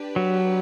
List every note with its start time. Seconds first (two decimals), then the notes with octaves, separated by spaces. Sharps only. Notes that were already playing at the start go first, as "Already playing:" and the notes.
Already playing: D4 G4 B4
0.16 F#3